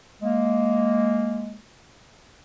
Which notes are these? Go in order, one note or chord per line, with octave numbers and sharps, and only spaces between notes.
G#3 A#3